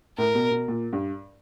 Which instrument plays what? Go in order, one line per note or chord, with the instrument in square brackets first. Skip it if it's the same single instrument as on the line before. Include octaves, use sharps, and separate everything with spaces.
[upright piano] A2 [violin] A#4
[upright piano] B2
B2
A#2
G2